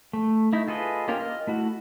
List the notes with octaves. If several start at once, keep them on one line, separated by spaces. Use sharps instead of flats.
A3
A3 D#4 E4
F4 G#4 A4 B4 D#5
A#3 C#4 F4 G4 A#4
D#5 F6
A3 E4 F#4